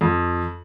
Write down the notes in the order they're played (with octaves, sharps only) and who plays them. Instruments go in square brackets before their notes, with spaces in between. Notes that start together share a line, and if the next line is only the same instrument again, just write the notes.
[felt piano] F2